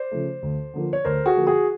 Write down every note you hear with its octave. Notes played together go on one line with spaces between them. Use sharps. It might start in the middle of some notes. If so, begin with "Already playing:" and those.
Already playing: C5 D5
C#3 F3 A3
D2
D3 F3 A#3
C#5
D2 A#4 C5
F#4 G#4
D3 F3 A#3
F#4 G#4